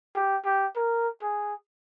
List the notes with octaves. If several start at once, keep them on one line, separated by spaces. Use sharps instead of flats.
G4
G4
A#4
G#4